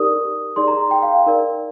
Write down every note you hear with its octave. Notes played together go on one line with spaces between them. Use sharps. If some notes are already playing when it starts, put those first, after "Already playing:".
Already playing: D#4 G4 A#4 D5 D#6
D#4 G#4 D5 C6
A#5
G5
F5
D#4 A#4 D5